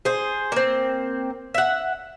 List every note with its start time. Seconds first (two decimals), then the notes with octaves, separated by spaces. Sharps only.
0.05 G#4 C5
0.52 A#3 C4
1.54 E5 F#5